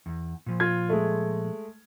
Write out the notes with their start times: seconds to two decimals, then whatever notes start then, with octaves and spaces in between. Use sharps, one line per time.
0.06 E2
0.46 A#2 F3
0.60 F4 G#6
0.89 G#3 A3